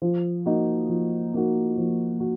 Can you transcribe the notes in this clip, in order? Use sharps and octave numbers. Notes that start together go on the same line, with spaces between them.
F3
A#3 D#4 F#4
F3
A#3 D#4 F#4
F3
F#4